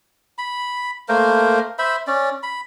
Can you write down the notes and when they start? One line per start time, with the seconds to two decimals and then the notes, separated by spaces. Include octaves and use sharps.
0.38 B5
1.09 A3 A#3 A#4 C5
1.79 C5 E5 B5
2.07 C#4 D5
2.43 B5